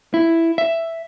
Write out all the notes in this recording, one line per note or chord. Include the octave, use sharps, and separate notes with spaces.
E4
E5